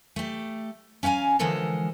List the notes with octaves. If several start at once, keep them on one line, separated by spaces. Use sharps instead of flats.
A3 G4
C#4 F5 F#5 G#5 A#5
D3 E3 F3 G#3 A4 A#4